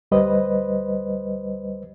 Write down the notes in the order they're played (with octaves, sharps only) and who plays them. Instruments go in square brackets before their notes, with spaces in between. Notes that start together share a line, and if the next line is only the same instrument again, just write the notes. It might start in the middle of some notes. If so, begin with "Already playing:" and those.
[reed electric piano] D2 G3 B4 C5 D#5